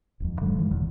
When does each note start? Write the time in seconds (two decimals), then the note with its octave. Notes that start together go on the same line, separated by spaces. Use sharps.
0.20 D#1 F2
0.41 G2 D3 F#3 G#3
0.58 D#3 E3 G#3
0.71 E1 E2 B2